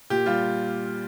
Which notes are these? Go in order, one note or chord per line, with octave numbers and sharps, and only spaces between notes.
A#2 G4
G3 F4